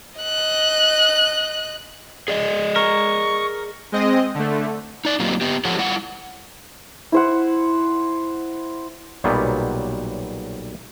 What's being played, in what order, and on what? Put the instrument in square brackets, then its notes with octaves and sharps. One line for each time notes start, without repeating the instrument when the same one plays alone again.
[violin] D#5 F#6
[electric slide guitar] G#4 D5 D#5
[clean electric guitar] A#4 [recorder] C#6
[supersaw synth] G#3 C4 D#5
D3 A3
[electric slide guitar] D#4 D5
F#3 A#3 C4 D#4 F4 G4
B3 G4
F3 F4 G4 A4 C#5 F#5
G3 E4 F4 F#5
[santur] E4 C5 F#5
[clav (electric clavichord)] B1 A#2 F#3 G3 B3